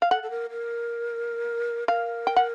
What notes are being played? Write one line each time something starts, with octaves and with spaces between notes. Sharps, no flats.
F5
A4 F#5
A4
A#4
A#4
A#4 F5
G5
F#5